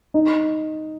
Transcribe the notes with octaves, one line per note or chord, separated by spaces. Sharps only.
D#4